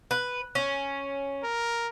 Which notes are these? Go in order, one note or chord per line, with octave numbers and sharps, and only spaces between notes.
B4
C#4
A#4